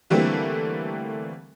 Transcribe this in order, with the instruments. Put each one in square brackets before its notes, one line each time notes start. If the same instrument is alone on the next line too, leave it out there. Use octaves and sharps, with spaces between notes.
[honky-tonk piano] D3 E3 G3 A3 A#3 C4